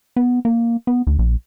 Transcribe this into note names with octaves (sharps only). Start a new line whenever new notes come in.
B3
A#3
B3
D2
A#1